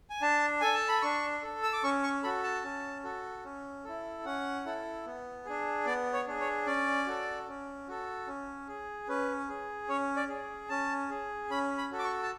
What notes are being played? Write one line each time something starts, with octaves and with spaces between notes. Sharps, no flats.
G#5
D4 A5
A4 G#5
A5
B5
D4 C#6
A4
E6
D6
C#4 C#6
C#6
F#4 A4 B5
A5
C#4
F#4 A4
C#4
E4 A4
C#4 F#5
E4 A4
B3
D4 G#4
B3 D5
C#5
D4 G#4
C#5
C#4 D5
F#4 A4
C#4
F#4 A4
C#4
G#4
C#4 B4
G#4
C#4 C#5
D5
G#4
C#4 A5
G#4
C#4 B5
B5
F#4 A4
D6
C#6
A5